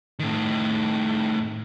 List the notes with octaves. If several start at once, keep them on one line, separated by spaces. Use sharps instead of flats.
A2 D#3